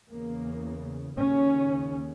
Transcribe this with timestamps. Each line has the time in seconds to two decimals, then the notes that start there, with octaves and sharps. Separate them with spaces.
0.10 E2 C#3 A#3
1.18 D#2 C#3 C#4